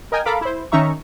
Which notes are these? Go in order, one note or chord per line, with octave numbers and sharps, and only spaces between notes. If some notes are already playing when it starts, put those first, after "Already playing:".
A#4 D#5 G5 G#5
A4 A#4 F5 A#5 B5 D6
E4 C5
D#3 C#4 D#4 E5 A#5 C#6